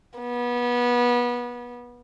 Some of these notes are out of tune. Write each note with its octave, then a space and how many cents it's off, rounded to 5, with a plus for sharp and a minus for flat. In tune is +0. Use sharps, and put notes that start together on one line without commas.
B3 -25